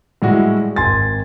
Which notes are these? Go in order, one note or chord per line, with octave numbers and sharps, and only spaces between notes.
A2 G3 G#3 E4 F#4
G#1 G#5 C6 A6